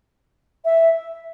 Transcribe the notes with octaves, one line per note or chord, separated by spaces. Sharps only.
E5